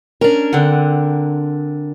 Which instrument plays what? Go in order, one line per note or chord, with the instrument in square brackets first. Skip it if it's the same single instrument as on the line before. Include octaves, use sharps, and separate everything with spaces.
[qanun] C#4 [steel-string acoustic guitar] D4 A#4
[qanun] D3 C4 F#5